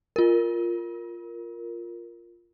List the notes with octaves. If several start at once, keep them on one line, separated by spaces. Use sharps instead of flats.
F4 A#4